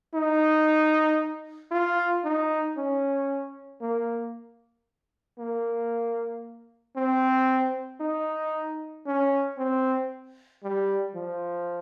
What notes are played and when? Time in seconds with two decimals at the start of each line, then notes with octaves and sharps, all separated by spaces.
0.14 D#4
1.71 F4
2.24 D#4
2.77 C#4
3.81 A#3
5.39 A#3
6.96 C4
8.00 D#4
9.06 C#4
9.58 C4
10.63 G3
11.15 F3